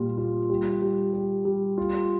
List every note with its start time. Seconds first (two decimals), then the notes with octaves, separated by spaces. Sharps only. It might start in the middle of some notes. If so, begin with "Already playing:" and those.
Already playing: A#2 G3 F4
0.18 F4
0.50 G3
0.82 G3
1.14 G3
1.45 G3
1.78 F4